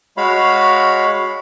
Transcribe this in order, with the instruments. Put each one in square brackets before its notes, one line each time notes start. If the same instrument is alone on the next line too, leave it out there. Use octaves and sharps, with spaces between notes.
[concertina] G#3 F#4 C#5 F5 B5